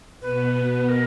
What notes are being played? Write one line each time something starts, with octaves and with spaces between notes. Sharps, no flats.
B2 B3 B4
A#4